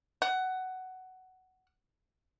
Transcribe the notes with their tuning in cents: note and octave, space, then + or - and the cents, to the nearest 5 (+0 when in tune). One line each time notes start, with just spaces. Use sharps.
F#5 +10